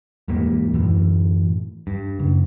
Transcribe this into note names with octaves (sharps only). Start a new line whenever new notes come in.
E2 G#2 G3 A#3
F#2 A2 E3
G2
F#2 C#3